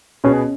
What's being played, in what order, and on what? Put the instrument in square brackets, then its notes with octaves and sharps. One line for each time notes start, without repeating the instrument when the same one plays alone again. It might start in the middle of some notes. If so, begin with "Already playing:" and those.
[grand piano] B2 B3 G#4 [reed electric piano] C#4